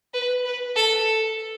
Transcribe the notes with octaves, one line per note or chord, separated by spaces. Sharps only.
B4
B4
A4